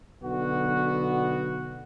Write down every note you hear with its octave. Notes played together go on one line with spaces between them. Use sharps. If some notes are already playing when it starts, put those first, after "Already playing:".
B1 D3 B3 F#4